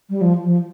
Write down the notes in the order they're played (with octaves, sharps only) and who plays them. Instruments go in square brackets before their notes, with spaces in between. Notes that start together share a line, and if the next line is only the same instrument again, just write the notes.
[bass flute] G3
F3
F3